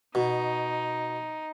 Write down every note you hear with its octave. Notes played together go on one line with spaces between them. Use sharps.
B2 D#4